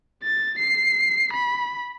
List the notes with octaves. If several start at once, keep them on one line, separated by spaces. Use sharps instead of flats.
A6
C7
B5